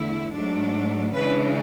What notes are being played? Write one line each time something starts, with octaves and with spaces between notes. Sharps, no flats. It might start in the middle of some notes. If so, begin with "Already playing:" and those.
Already playing: E2 D3 A3 E4
G#2 F#3 A3 D4
C#3 E3 G#3 D4 B4